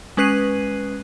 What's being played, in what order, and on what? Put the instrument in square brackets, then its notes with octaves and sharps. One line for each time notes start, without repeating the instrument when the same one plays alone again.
[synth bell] G#3 C#4 B4 F#6 C7 D#7